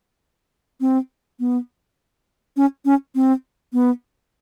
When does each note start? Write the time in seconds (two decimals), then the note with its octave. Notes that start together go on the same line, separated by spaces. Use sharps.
0.81 C4
1.40 B3
2.57 C#4
2.85 C#4
3.15 C4
3.73 B3